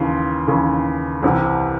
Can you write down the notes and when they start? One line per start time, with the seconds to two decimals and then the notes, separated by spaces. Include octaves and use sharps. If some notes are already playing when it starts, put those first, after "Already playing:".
Already playing: D#2 C#3 E3 C6
0.47 D#2 C#3 E3
1.23 C2 C3 E3